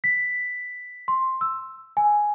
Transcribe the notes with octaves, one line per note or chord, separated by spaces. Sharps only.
B6
C6
E6
G#5